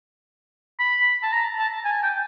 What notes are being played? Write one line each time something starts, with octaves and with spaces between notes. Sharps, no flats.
B5
A5
A#5
A5
G#5
G5